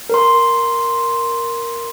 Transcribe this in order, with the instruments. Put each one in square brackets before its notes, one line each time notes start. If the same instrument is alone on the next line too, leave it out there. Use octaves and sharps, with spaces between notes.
[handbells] A#4 C6